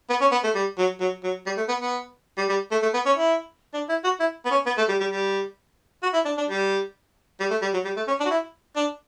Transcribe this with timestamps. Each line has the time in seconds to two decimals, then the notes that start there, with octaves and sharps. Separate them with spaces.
0.10 B3
0.21 C#4
0.31 B3
0.44 A3
0.55 G3
0.78 F#3
1.00 F#3
1.24 F#3
1.46 G3
1.57 A3
1.68 B3
1.80 B3
2.37 G3
2.49 G3
2.71 A3
2.82 A3
2.94 B3
3.06 C#4
3.16 E4
3.74 D4
3.89 E4
4.04 F#4
4.20 E4
4.45 B3
4.51 C#4
4.66 B3
4.77 A3
4.88 G3
5.00 G3
5.11 G3
6.03 F#4
6.13 E4
6.25 D4
6.37 D4
6.49 G3
7.40 G3
7.50 A3
7.62 G3
7.73 F#3
7.84 G3
7.96 A3
8.07 C#4
8.20 D4
8.25 F#4
8.30 E4
8.76 D4